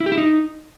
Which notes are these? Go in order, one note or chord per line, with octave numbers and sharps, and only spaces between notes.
E4
G4
E4
D#4